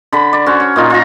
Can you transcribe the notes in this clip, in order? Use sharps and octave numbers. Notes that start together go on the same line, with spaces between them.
D3 B5
D5
C#4 F#4 C5
C#5
A#2 D#4 F4
F4 A#5